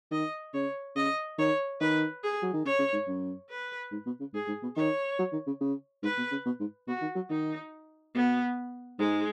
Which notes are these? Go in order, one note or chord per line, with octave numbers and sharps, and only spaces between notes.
D#3 D#5
C#3 C#5
C#3 D#5
D#3 C#5
D#3 B4
G#4
F#3
D#3
C#3 C#5
C#3
G#2
F#2
B4
G#2
B2
C#3
G#2 G#4
G#2
B2
D#3 C#5
F#3
D#3
C#3
C#3
G#2 B4
B2
C#3
B2
G#2
B2 F#4
D#3
F#3
D#3 D#4
B2 B3
G#2 G#3